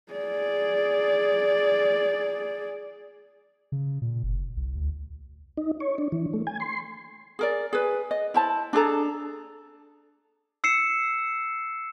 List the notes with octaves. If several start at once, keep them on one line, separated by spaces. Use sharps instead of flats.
G#4 D5
C#3
A#2
F#1
C2
D2
D#4
C#5
D4
E3
A3
G#5
C6
G#4 A#4 D5
G#4 B4
D#5
E4 C5 A5
D4 G#4 A4 A#5
E6 C7 C#7 E7